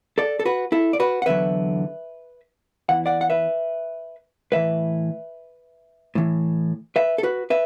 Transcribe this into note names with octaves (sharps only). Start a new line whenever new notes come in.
A4 D5
A4
F#4 B4
E4 A4
D5
F#4 B4
F#5
E2 D3 F#3 B4 E5
E2 E3 F#5
D5 F#5
F#5
B4 E5
A2 E3 B4 E5
A2 E3
B4 E5
A4
F#4 B4
B4 E5